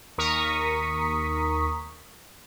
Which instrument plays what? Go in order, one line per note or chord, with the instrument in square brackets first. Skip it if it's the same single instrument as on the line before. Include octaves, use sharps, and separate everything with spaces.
[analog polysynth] D#2 A#4 A#5 C#6 D#6 B6